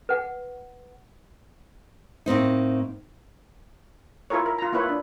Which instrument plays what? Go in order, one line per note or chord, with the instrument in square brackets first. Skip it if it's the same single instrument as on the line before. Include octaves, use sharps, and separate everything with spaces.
[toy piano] B4 F#5
[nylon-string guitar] A2 A#3 C4 D#4
[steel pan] E4 F4 A4 A#4 C#5
A#4
F4 A#5
A#3 E4 F4 B4 C#5
D4